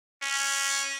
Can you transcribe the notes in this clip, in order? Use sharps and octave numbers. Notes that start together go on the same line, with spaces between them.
C#4